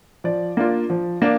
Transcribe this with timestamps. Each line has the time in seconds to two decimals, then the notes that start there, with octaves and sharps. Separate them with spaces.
0.24 F3 D5
0.57 A#3 D4 F4
0.90 F3
1.22 A#3 D4